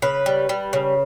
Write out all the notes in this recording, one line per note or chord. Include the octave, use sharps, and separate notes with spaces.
C#3 B4
G3
G3
C#3